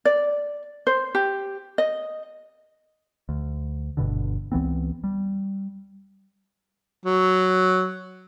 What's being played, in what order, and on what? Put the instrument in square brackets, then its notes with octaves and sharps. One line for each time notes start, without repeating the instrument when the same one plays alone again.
[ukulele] D5
C5
G4
D#5
[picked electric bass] D2
G1 G2 B2 D3
C#2 E3 B3 C4
G3
[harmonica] F#3